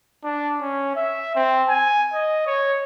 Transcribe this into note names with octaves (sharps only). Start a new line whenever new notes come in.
D4
C#4
E5
C4
G#5
D#5
C#5